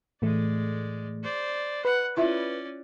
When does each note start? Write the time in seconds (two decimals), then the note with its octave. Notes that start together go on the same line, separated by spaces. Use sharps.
0.22 A2 E3 G#3 A3 D5
1.24 C5 D5
1.85 B4 F#5
2.17 C#4 E4 F4 D5 E5